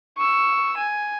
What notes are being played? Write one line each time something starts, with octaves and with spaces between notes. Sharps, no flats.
C#6 E6
G#5